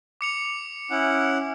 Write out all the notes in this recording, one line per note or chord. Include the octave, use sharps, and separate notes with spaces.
D6 C#7 F7
C#4 E4 F#5